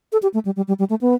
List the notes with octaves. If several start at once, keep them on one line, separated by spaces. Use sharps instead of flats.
A4
G4
A3
G3
G3
G3
G3
A3
B3